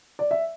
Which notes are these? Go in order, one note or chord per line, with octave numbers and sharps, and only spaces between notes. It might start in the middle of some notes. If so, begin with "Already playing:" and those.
D5
E5